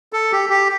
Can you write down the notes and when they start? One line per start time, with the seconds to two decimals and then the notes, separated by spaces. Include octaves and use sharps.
0.13 A4
0.32 G4
0.49 G4